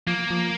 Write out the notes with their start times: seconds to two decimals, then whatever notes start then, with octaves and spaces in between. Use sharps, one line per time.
0.07 F3 A#3
0.30 F3